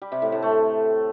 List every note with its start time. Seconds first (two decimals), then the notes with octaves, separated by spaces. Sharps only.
0.02 G3
0.12 C3
0.22 A2
0.32 A2
0.42 A3